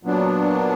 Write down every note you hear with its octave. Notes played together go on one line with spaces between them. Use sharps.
A#2 F#3 B3 D4